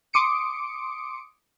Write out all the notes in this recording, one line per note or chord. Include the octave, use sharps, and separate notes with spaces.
C6 D6 D#6 C#7 D7